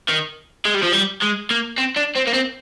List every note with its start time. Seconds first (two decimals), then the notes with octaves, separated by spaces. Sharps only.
0.08 D#3
0.66 G#3
0.75 G3
0.83 F3
0.93 G3
1.22 G#3
1.50 A#3
1.78 C4
1.97 D4
2.16 C4
2.27 A#3
2.34 C4